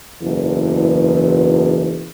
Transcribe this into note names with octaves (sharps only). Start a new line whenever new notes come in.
F#1 B1 E2